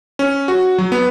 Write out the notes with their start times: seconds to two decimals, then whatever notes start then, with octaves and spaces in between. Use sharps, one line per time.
0.19 C#4
0.48 F#4
0.78 F#3
0.92 B3